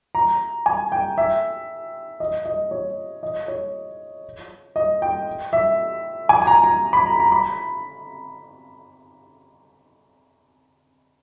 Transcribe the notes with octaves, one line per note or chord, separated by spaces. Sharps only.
A#5
G#5
G5
E5
D#5
D#5
C#5
D#5
C#5
D#5
G5
E5
G#5
G#5
A#5
A#5
B5
A#5
A#5
B5